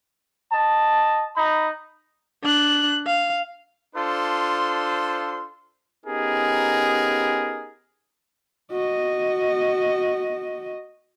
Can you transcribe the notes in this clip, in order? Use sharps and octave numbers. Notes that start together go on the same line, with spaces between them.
D#5 A5
D#4 A#5 B5
D4 F#6
F5
D4 F4 A4 C5 C6
B3 C#4 D#4 G4 G#4 A#4
F#4 D#5